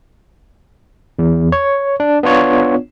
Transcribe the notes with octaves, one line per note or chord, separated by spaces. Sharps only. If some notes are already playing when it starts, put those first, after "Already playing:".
E2
C#5
D4
B3 D4 F4 C#5